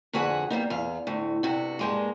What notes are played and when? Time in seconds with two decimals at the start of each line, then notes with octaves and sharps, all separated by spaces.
0.13 F2 D3 F#4 G#4 B4 F#5
0.50 G3 A#3 B3 D#4
0.70 E2 F5
1.07 D2 A2
1.43 G2 C3 F#4
1.79 G2 G#3 A#3